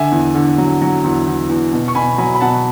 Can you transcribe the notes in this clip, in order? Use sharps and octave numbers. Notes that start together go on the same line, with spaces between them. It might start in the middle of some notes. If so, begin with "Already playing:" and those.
Already playing: D3 E5 G#5
E2
D3
F#3
F#3
E2
E2
E2
B2
C#6
B2 G#5 B5
F#3 G#5 B5
B5
B2 F#5 A5